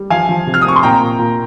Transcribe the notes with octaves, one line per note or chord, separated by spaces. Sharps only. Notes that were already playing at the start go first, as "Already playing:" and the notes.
Already playing: G3
F3 F5 G#5
F3
C3
F6
D#6
C4 C#6
C6
A#2 G5 A#5
A#2
A#2